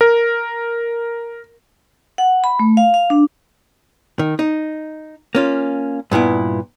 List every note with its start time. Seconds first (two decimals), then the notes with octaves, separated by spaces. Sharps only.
0.01 A#4
2.18 F#5
2.44 B5
2.59 A3
2.77 F5
2.94 F5
3.10 D4
4.19 D#3
4.39 D#4
5.35 A#3 C#4 F4
6.11 G2 A#2 B3 E4